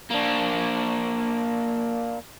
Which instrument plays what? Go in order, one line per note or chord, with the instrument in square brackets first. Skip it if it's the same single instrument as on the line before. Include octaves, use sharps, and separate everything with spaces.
[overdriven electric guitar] A#3 D4